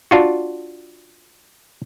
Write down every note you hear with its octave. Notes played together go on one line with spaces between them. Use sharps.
D4 F4 F#4